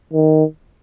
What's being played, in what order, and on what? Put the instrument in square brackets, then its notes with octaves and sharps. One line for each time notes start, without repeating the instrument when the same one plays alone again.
[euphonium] D#3